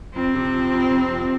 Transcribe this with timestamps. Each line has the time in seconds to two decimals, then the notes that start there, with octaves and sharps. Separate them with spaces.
0.15 F2 C4
0.35 C3
0.53 F3
0.73 F2
0.92 F2
1.11 F2